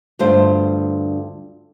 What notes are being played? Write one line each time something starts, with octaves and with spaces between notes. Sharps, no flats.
D2 G2 D4 F4 C5